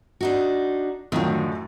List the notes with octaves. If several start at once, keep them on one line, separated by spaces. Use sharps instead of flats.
D4 D#4 F#4
F#2 A2 D3 D#3 F3